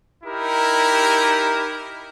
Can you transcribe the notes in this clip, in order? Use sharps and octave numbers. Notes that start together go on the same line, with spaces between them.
D#4 E4 G4 A#4